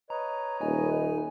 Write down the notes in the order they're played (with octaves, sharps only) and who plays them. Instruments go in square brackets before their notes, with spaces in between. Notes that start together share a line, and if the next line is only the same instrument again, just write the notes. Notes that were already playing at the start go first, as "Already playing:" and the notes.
[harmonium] B4 C#5 D#5 [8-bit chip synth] A#5
[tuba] D#1 [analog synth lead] D#4 [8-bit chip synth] G#5